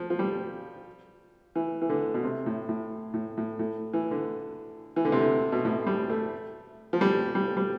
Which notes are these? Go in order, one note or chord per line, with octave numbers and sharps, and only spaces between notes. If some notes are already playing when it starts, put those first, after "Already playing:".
Already playing: F3
F3
G3
E3
E3
D3
B2
C3
A2
A2
A2
A2
A2
E3
D3
E3
D3
C3
D3
B2
A2
G3
A3
F3
G3
G3
G3